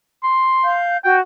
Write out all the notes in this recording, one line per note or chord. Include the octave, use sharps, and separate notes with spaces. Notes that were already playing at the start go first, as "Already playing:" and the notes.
C6
F5 G6
F#4 G5